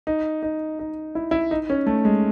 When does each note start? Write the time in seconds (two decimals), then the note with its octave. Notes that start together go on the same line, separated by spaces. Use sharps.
0.07 D#4
0.42 D#4
0.79 D#4
1.15 E4
1.31 E4
1.51 D#4
1.70 C#4
1.87 A3
2.05 G#3